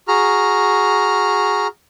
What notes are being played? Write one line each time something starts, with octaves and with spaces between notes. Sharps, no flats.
F#4 G#4 A#5 F6